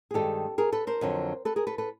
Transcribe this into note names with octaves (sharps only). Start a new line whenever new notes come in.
G#4
G2 D#3 G#3 C4 G4 A4
G#4 A#4
A4 B4
A#4 C5
F2 D3 F#3
A4 B4
G#4 A#4
A4 B4
A4 B4